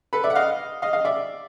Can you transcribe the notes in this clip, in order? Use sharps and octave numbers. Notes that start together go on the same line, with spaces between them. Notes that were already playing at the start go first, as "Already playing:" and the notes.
A4 B4
D5 E5
F#5
D#5 F5
D#5 F5
D#5 F5
D5 E5